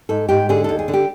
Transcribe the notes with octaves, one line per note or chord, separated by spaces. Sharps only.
G#2 A4
G#2 G4
D3 G#4
D#2 A4
G#4
D3
G4